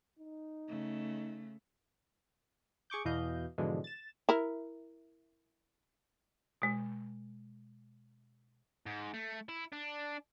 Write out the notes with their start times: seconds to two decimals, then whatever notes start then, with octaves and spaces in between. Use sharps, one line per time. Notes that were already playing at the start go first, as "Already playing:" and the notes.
0.19 D#4
0.67 C#3 A3
2.90 G#4 C#6 D6 G6
3.05 E2 B2 E3 D#5 F5 G6
3.58 G#2 B2 D3 E3 F3 G#3
3.84 A6 E7
4.29 E4 A#4
6.62 B2 G#3
8.86 G#2
9.14 A3
9.49 E4
9.73 D4